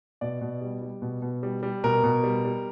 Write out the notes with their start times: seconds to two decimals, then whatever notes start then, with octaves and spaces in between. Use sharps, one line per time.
0.21 B2 D5
0.41 B2
0.62 G3
0.82 G3
1.02 B2
1.22 B2
1.43 G3
1.63 G3
1.84 B2 A#4
2.04 B2
2.24 G3
2.44 G3